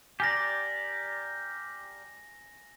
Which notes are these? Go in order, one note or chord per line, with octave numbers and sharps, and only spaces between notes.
G4 A#4 D5 G#5 A#6